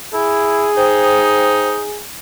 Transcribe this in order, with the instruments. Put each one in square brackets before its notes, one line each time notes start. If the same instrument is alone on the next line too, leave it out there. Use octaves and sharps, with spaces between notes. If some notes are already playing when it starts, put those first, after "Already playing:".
[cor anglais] E4 [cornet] G#4
[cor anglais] D#4 [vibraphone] C5 G5